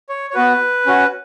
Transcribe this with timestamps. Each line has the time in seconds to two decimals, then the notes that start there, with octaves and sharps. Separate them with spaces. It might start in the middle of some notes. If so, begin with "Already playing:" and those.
0.09 C#5
0.30 C#5
0.35 B3 F#4 B4
0.86 C#4 F#4